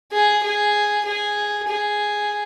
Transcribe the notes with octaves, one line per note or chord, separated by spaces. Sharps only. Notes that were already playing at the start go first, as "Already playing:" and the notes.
G#4
G#4
G#4
G#4